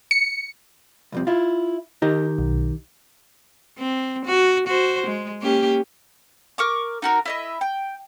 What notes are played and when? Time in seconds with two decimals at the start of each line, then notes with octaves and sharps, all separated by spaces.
0.11 C#7
1.12 C2 F2 C3
1.27 E4 F4
2.02 D#3 D#4 G4 A#4
2.39 B1
3.78 C4
4.25 F#4
4.67 F#4 C5
5.07 G#3
5.41 A#3 C#4 G4
6.58 A#4 C#6 D6
7.02 D#4 F#4 A#4
7.25 E4 D#5 E5
7.61 G5